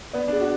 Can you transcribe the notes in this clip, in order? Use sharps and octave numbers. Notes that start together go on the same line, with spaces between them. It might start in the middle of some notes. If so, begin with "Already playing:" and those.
B3 D5
D4
G#4
F#4